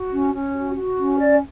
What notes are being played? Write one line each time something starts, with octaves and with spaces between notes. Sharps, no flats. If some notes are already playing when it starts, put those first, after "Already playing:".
Already playing: F#4
C#4
C#4
F#4
F#4
C#4
D5